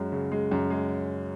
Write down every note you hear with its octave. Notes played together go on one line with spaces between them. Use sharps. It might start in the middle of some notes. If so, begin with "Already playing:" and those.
Already playing: F#2 F#3 G#3
C#3
G#3
F#2
G#3